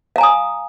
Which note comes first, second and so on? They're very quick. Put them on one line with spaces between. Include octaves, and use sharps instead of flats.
F5 A#5 G#5 D#6